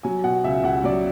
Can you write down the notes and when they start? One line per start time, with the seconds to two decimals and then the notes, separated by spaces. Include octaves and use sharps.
0.03 F#3 G#5
0.24 B2 F#5
0.44 C#2 E5
0.64 C#2 F#5
0.84 F#3 D5